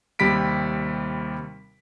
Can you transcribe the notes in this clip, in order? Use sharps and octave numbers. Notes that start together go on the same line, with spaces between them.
D#2 C3 G3 B5 B6 D7